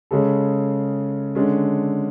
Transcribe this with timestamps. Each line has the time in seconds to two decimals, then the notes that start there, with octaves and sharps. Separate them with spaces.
0.11 C#3 G#3 C#4 A4
1.35 D3 G#3 C#4